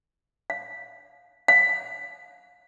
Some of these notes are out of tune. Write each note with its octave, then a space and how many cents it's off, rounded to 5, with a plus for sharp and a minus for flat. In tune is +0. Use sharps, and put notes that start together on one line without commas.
F5 +15
F5 +30